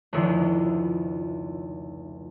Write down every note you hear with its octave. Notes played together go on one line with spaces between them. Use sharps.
F1 C#2 D#3 D4 E4